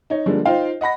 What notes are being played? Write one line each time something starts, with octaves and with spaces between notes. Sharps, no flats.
D#4 C#5
D3 F3 G3 G#3 A#3
D#4 F4 C5 F5 G5
D#5 F#5 B5 A#6